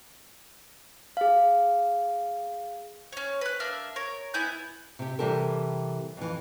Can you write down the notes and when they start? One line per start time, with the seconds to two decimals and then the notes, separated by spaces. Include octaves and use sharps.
1.17 G#4 F5
3.12 C#4 C#5
3.41 B4 F#6
3.60 A#3 D4 E5 F6
3.96 A#4 C#5
4.34 B3 E4 G#5 G6
4.99 C3 G4
5.19 C3 E3 G3 G4 A4 A#4
6.17 F2 E3